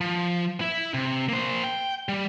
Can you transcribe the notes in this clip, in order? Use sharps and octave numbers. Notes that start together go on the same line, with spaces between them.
F3
E4 E5
C3
A#3 C5
G5
G3